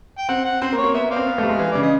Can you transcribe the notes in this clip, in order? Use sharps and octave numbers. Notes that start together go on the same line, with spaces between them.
G5
C4 F#5
F#5
C4 C5
A#3
C#5
A#3
B3 E5
B3
C5 D5 F5
C4
B3
G3 A3
G#3
E3
C#3 D5
D#5